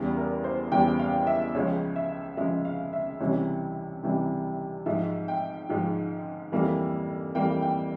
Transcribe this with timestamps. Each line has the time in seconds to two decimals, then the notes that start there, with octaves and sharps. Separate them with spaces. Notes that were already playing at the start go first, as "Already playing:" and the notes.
Already playing: E2 C#3 G3
0.17 A#4
0.44 C5
0.71 E2 C#3 G3 G5
0.99 F5
1.27 E5
1.55 C#2 C#3 F3 G#3 C#5
1.96 E5
2.37 C#2 C#3 F3 G#3 E5
2.65 F5
2.93 E5
3.20 C#2 C3 E3 G3 C#5
4.03 C#2 C3 E3 G3
4.86 G#2 F3 G#3 E5
5.28 G5
5.69 G#2 F3 G#3
6.52 F2 E3 G3 A#3
7.35 F2 E3 G3 A#3 G5
7.62 G5